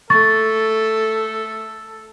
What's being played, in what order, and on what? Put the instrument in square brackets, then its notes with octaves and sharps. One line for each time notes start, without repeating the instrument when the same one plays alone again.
[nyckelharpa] A3 [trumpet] A4 [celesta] C#6 A6